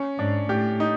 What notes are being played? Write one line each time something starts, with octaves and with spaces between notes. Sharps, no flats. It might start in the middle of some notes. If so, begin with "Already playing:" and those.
Already playing: C#4
G#2 D4
A2 G4
D#4